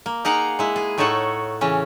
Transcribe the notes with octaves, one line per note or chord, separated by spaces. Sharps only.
A#3
D#4 G#4 A#4 F5 F#5 A#5
G#3 E4
G#4
A2 A3 D#4 A4 C#5 F#5
C#3 E3 C#4